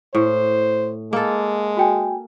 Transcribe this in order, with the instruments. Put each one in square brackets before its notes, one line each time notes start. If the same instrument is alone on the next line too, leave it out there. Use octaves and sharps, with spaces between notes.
[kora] A2 [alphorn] C5
[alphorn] G#3 [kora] A#3 A4
[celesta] F#4 G5 G#5